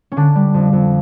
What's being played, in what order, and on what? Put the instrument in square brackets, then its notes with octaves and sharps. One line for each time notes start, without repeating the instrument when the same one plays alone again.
[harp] C#4
D3 D4
G3
F2
F2